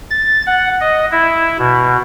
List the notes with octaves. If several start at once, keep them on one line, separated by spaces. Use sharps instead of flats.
A6
F#5
D#5
E4
B2